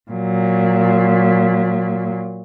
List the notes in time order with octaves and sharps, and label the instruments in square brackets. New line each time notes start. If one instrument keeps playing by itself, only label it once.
[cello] A#2 F#3